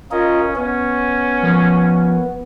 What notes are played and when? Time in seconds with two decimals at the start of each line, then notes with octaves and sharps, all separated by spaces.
0.11 C#4 F4 A#4 D#5
0.56 B3 C#4
1.43 F3 A#4 C#5